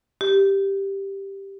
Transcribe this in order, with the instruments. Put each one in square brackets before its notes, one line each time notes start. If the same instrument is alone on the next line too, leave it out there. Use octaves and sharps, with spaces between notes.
[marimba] G4